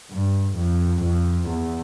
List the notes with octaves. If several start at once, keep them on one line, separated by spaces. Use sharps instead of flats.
G2
F2
F2
E2